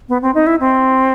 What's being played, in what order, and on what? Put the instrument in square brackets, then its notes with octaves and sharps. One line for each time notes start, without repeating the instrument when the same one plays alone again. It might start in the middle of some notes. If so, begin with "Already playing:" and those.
[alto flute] B3
C4
D#4
E4
C4